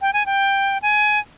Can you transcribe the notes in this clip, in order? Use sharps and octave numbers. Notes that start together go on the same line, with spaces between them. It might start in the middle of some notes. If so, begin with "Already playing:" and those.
G5
G#5
G5
G#5